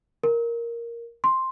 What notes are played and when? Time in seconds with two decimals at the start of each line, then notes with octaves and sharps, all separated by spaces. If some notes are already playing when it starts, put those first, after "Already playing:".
0.23 A#4
1.24 C6